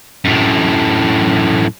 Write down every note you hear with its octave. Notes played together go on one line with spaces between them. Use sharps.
F#2 A2